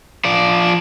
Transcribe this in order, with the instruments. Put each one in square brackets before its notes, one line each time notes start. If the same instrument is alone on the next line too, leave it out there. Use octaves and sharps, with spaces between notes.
[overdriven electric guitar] F3 D5